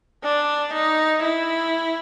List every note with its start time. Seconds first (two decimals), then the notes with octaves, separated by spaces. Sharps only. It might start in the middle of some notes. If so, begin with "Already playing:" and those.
0.24 D4
0.74 D#4
1.23 E4